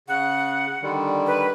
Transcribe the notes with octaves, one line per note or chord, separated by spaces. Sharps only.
C#3 F#5
D3 D#3 G3
B4